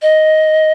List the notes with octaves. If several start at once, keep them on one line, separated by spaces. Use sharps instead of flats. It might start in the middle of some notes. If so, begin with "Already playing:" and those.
D#5